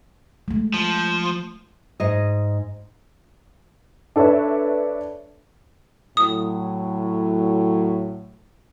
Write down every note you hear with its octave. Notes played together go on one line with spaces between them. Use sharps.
G#3 A3
F3
G#2 D#5
D4 A4 B4 C#5 E5
A2 F#3 D#6